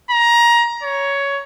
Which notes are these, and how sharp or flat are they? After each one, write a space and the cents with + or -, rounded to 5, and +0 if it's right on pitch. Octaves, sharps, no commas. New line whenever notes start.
A#5 +20
C#5 +10